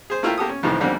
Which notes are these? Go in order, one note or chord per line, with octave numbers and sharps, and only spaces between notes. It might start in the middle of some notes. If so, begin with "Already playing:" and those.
G#4 C5
A3 E4 F4 A#4 G5
A#3 G4 A4 D#6
C#4
F2 A2 C3 D#3 E3
F2 G#2 D3 G3 A#3 C4